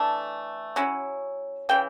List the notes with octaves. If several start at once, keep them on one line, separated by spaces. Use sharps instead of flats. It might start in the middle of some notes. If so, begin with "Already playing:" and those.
Already playing: E3 A3 D4 A5
F#3 C#4 E4
C#3 E3 G5